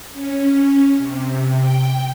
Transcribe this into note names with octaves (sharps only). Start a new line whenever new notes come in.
C#4
C3
G5